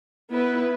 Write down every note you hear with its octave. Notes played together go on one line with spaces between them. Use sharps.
B3 E4 B4